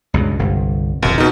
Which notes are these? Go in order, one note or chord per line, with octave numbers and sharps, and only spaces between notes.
C#2 G2 B2
G1 C2 G2
E1 C#2 A#2
B2 D#4